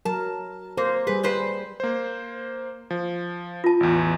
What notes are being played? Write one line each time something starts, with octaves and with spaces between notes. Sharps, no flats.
F#3 A#4 A5
A#3 C5
G3 G#4 B4
A#2 B4 C5
A#3 C5
F3
F4 A5
A1 E2